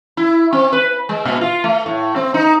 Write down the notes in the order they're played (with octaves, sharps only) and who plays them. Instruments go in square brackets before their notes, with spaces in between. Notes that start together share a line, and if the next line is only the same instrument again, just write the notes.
[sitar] E4
C4
B4
G#3
A#2
F4
A3
A2
C4
D#4